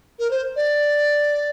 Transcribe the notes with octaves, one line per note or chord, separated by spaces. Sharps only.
A#4
C5
D5